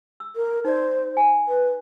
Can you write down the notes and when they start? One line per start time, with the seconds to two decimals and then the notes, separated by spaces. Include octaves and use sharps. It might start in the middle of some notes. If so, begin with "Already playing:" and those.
0.20 E6
0.36 A#4
0.65 D#4 C5 D5
1.17 G#5
1.48 B4